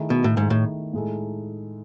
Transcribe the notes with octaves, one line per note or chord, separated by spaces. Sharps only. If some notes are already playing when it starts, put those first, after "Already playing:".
Already playing: D#3 A3 E4 G#4
B2
A2
G#2 D#3 A3 E4 G#4
A2
A2 G#3 D#4 A4